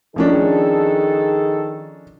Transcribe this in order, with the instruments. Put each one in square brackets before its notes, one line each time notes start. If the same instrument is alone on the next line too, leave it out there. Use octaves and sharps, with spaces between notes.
[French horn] D#3 [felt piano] F3 C#4 D4 [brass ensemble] G#4 A4